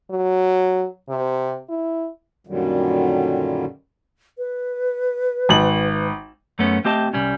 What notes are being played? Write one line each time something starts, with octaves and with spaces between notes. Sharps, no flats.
F#3
C3
E4
F#2 A#2 D3 D#3 F#3 G3
B4
G#1 F#7
F#2 A3 B3 C#4
A3 C4 G4 D#5 A5
C2 G3 C#4